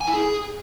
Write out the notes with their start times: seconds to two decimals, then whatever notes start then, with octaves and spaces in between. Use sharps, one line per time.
0.01 G#5
0.07 E4
0.14 G#4